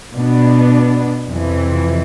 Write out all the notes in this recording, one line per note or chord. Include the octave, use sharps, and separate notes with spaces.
B2 B3 D4
F2 C3 E3